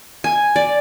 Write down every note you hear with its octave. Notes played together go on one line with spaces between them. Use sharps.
G#5
D5